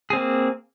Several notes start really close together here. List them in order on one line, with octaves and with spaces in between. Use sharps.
G#4 C4 A#3